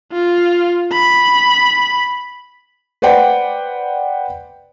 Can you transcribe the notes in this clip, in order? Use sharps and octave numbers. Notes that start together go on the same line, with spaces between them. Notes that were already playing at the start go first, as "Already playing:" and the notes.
F4
B5
B4 C5 D5 F#5 G5